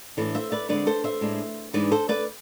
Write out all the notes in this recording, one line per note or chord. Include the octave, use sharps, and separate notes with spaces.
A2 E3 A3 D4
C5 E5
B4 D5
D3 G#3 C4 B4 D5
A4 C5
C5 E5
A2 G#3 D4
G#2 E3 G#3 D4 B4 D5
A4 C5
B4 D5